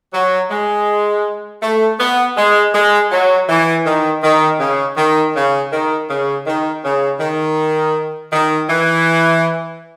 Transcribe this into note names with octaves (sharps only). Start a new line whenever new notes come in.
F#3
G#3
A3
B3
G#3
G#3
F#3
E3
D#3
D#3
C#3
D#3
C#3
D#3
C#3
D#3
C#3
D#3
D#3
E3